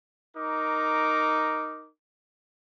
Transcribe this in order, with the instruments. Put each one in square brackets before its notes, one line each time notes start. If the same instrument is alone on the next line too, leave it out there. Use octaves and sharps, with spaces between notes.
[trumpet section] D#4 A#4 D6